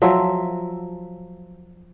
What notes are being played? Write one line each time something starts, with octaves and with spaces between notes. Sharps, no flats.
F3 F#3 E5